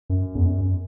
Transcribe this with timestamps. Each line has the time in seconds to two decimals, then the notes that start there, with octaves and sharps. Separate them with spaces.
0.10 F#2
0.35 E2
0.45 F#2